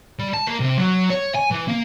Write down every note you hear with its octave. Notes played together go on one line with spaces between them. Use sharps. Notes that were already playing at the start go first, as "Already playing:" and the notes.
G3
A5
A#3
C3
F#3
C#5
G#5
E3
A#3